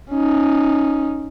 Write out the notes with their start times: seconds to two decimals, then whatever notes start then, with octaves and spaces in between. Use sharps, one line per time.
0.11 C#4 D#4